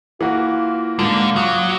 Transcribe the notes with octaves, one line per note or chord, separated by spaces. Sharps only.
E3 A#3 F4 F#4
G#2 D3 A#3 F4
F#3 D6 D#6